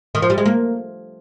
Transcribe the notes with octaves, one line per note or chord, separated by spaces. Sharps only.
D#3
F3
G3
G#3
A#3